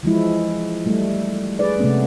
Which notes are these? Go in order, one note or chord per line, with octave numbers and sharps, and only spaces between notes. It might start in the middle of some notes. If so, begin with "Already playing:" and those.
E3 F3 G#3 E4
G3 A3
G#4 B4 D5
C3 G#3 A3 B3 C#4